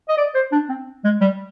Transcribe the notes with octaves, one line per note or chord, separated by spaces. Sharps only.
D#5
D5
C5
D4
C4
G#3
G3